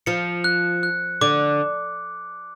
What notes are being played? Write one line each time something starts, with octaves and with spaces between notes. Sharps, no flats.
F3 C#7
F#6
F#6
D3 D6